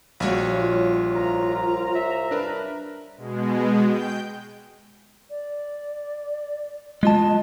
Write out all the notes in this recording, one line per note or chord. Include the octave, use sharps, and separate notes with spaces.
A#1 G3 F#4 C#5 F5
F4
C2 A#5
E5
D4 A#4 B4
B2 G#3
G5 G6
D5
G#3 F4 D#5 A5